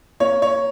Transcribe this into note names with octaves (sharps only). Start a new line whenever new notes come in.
A#3 C#5
C#5